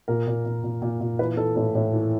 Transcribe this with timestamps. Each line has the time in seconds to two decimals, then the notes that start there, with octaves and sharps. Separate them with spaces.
0.08 A#2 A#4
0.27 A#2
0.45 A#2
0.63 A#2
0.82 A#2
1.00 A#2
1.19 E3 B4
1.37 E3 A4
1.56 A2 A4
1.75 A2
1.93 E3